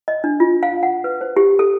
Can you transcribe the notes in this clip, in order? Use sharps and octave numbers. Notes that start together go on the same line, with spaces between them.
D#5
D4
F4
F5
F#5
B4
C5
G4
A4